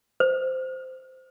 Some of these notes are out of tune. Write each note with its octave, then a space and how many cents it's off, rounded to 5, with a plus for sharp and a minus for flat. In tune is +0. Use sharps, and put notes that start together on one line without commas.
C5 -10